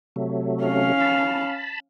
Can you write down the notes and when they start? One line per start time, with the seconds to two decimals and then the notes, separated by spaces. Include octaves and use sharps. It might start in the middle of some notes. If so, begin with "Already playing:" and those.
0.16 C3 F#3 A3
0.63 C#4 F5
1.00 A5 B5